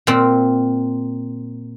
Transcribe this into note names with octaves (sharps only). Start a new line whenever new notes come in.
A#2 C4